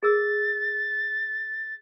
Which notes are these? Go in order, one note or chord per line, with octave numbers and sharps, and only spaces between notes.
G#4 A#4 E6 A6